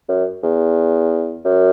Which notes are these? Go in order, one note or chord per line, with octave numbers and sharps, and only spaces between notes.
F#2
E2
F#2